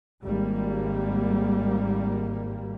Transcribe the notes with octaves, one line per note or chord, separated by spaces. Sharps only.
G#1 G#2 G3 A#3